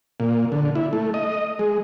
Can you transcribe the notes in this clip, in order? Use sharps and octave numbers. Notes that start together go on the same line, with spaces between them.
A#2
D3
E4
A3
D#5
G#3